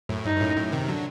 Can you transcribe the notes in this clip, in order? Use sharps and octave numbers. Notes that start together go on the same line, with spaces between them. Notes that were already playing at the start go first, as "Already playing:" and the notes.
F#2 A2
G2 D#4
G2
F#2 A2
F#2 A2
C3 D#3
D3 F#3